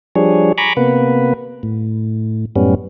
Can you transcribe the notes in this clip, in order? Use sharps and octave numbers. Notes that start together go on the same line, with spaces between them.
F3 G3 D4 G#4 C#5
G#5 A#5 B5 C#6 D6
C3 A#3 B3 B4
A2
F#2 A2 G3 B3 C#4